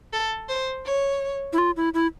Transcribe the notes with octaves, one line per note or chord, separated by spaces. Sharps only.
A4
C5
C#5
E4
F4
E4
E4